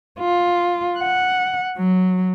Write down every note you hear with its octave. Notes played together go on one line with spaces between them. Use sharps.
F4
F#5
F#3